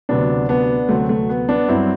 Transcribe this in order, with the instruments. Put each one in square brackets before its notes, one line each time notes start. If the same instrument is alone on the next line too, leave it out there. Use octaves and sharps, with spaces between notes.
[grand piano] D2 C3 F#3 B3 D4
B3 D4
D2 C3 F#3 A3 C4
A3
B3
B3 D4
G2 F#3 C4 E4